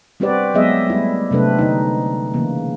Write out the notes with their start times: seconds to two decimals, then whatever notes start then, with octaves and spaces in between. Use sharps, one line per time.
0.20 G3 C4 F#4 G4 B4 D5
0.54 F#3 G#3 B3 G#4 D#5 E5
0.89 G3 A3 E4
1.31 C3 F#3 A3 C4 D4 B4
1.59 D3 A3 D#4
2.34 C#3 E3 A#3